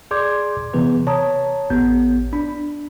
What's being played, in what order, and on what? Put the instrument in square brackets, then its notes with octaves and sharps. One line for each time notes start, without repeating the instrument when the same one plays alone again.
[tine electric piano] G#4 D5 C6 D6 G6 G#6
C3 E3 B3 G#4 B4
C#5 A5 A#5 D#6
A1 B3 G6
D4 B5